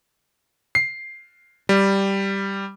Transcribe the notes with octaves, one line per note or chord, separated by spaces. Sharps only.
C7
G3